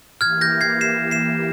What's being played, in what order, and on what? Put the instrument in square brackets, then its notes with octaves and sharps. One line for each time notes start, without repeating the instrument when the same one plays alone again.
[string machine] E3 A#3 E4 G4 [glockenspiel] F6 G#6
[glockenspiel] G6 A#6
G#6 C7
C7 E7
C7 E7